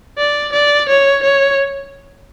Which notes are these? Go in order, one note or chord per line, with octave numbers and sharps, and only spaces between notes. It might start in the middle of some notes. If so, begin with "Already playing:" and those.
D5
D5
C#5
C#5